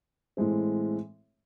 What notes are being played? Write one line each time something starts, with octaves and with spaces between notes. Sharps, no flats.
A2 E3 G#3 C4 E4